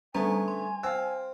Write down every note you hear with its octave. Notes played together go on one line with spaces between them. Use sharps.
D3 G3 A3 B3 C#4 G#4 G#5 A#5
C6
C4 F5 E6